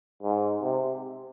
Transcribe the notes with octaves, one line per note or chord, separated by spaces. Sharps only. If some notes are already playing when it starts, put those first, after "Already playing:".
G#2
C3